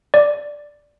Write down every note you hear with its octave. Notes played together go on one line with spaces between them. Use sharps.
D5